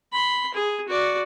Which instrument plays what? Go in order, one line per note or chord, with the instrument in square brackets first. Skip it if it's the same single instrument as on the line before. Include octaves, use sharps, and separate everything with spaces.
[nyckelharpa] B5 C6
G#4
F#4 D5